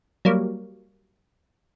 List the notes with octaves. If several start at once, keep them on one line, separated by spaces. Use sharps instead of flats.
F#3 G3 A#3